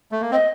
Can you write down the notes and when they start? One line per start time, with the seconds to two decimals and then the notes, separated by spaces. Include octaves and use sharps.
0.12 A3
0.21 A#3
0.31 C4 D#5